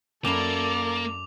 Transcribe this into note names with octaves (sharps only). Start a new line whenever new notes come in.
F#2 A#3 E4 A4 D5 D6 F7